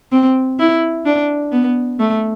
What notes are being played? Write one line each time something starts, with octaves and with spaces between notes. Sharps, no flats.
C4
E4
D4
B3
A3